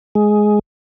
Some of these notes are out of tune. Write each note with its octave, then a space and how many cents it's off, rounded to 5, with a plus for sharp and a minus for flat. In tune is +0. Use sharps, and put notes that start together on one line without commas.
G#3 +10